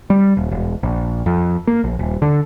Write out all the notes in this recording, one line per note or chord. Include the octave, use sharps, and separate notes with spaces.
G3
D#1
E1
A#1
F2
A#3
A#1
D#1
D3